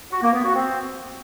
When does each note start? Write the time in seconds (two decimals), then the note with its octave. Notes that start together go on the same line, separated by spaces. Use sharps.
0.12 F#4
0.23 A#3
0.34 B3
0.44 F#4
0.55 C4